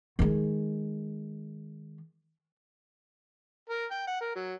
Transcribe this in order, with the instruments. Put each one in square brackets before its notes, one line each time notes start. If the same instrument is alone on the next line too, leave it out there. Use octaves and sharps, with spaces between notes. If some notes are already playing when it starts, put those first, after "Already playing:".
[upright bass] D#3 G#3
[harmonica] A#4
G5
F#5
A#4
F#3